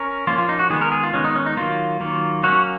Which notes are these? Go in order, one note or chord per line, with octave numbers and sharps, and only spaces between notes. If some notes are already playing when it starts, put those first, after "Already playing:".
Already playing: C#4 A#4
F3 A#3 C#4 F4
F4
D#4
F#4
D#3 G#3 B3 G#4
A#4
G#4
F4
D#3 G#3 B3 C#4
D#4
C#4
D#4
D#3 F#3 A#3 F4
D#3 F#3 A#3
F#3 A#3 C#4 F#4